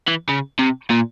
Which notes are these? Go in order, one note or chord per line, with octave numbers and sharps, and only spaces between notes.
E3
C#3
C3
A#2